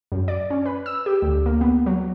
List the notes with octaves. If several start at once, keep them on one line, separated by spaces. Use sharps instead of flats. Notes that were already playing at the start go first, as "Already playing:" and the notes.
F#2
D5
C#4
B4
E6
G4
D2
A#3
B3
F#3